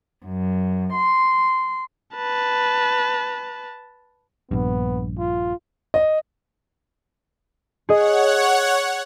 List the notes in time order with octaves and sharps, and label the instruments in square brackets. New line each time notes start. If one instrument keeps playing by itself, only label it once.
[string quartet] F#2
C6
[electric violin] B4 A5
[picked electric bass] A#1 G2 [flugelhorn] B3
[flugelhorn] F4
[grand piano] D#5
[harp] G#4 D#5 [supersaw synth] C#5 F#5